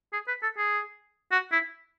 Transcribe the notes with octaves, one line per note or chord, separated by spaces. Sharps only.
G#4
B4
A4
G#4
F#4
E4